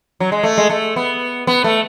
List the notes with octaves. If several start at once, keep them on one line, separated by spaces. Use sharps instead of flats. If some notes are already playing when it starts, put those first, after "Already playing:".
F#3
G#3
A3
G#3
A3
B3
B3
A3